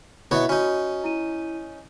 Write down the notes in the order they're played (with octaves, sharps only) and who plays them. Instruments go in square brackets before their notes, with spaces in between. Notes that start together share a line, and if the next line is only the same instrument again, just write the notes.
[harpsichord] B2 B3 C#5 [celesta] E4 E5
[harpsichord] C#4 D#4 [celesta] F#4
[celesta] E4 D#7